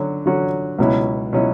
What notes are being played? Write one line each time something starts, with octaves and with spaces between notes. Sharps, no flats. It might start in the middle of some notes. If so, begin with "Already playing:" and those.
Already playing: D3 F#3 C#4 F#4
D3 F#3 C#4 F#4
C#2 B2 F#3 C#4 E4
B2 F#3 C#4 E4